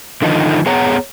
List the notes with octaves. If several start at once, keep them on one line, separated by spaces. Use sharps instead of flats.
D3 D#3 F3 D#4
B3 G#4 C#5 F#5 A#5